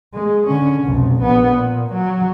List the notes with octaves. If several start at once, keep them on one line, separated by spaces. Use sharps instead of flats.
G#3
D3 C#4
F1 B1
A#1 B3
A#2
F#3